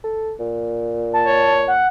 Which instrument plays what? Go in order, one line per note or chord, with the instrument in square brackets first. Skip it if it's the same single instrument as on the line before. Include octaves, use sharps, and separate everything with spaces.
[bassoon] A4
A#2
[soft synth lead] A5
[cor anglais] C#5
[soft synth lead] F#5